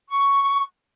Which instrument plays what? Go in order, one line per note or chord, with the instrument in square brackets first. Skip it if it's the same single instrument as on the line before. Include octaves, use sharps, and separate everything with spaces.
[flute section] C#6